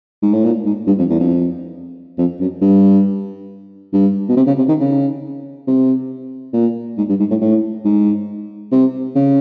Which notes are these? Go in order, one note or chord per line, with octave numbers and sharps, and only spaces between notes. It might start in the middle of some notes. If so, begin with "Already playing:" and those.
G#2
A2
A#2
G#2
G2
F2
E2
F2
F2
F#2
G2
G2
B2
C3
C#3
C3
D#3
C#3
C3
A#2
G#2
G2
G#2
A2
A2
G#2
C3
C#3